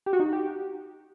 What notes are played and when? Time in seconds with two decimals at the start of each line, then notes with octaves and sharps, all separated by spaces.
0.06 G4
0.13 F#4
0.20 D#4
0.26 F#4
0.33 G4